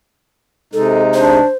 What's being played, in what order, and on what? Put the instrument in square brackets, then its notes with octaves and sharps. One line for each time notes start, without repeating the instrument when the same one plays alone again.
[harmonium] C3 G#3 D#4 [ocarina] A4
[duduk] D4 [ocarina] C5